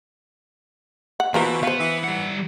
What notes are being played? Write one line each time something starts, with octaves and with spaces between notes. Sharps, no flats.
F#5
B2 E3 A#3 C4 F4 A#4 B4
B3 C5 F5
E3
G3 F#5